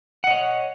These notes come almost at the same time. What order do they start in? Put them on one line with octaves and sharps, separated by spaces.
F#5 D#5 C#5